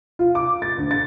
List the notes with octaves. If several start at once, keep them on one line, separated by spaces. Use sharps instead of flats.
F4
D6
A6
D2
A6